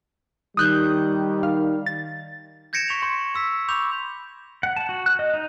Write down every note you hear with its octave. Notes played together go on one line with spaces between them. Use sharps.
D#3 G3 D#6 F#6 G6
F5
A6
G6 G#6 A#6 C#7 D7 E7
C#6 B6 F7
C6 G6 A#6
C6 E6 B6
B5 C#6 D6 G6 F7
F#5
A5
F#4
F#6
D#5
D#4